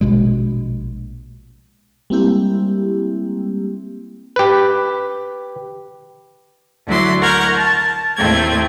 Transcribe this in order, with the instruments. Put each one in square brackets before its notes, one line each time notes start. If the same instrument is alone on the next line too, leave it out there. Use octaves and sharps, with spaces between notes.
[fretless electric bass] A#1 B2 G#3
[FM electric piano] G3 G#3 A#3 C4 E4 G4
[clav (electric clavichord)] G4 B4
[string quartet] D2 F#3 E4 F#4 D5 C6
A#4 F#5 C#6 F6 G6 G#6
A5
D#2 A2 A3 C4 G5 G#6